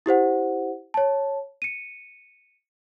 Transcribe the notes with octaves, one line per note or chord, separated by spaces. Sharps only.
E4 G4 C5 F#5
C#5 A5
C#7 D#7